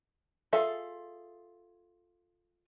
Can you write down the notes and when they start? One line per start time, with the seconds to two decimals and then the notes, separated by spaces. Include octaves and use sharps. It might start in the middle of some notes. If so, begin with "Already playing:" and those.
0.53 F4 G#4 A4 E5